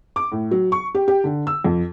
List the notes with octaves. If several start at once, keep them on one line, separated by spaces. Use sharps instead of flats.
D6
A2
F#3
C#6
G4
G4
D3
E6
F2